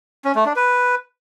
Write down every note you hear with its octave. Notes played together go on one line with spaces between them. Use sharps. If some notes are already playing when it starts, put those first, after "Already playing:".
C#4
A3
D4
B4